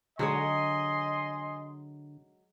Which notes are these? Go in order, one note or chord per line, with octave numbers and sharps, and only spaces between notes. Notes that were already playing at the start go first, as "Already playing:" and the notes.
D3 F#3 G#3 C#5 D#5 G#5 C6